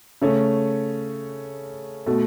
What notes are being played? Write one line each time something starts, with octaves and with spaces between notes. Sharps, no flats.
C#3 A3 C#4
B2 A3